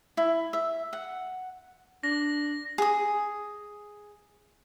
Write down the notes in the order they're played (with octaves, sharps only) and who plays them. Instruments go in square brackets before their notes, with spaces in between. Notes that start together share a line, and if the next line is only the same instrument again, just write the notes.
[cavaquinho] E4
E5
F#5
[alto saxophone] D4 [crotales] A#6
[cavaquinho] G#4 D#6